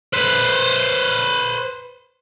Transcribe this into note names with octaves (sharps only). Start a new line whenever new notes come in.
B4 C5